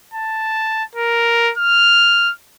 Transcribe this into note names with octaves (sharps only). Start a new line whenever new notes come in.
A5
A#4
F6